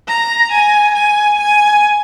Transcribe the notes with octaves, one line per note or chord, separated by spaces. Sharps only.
A#5
G#5
G#5
G#5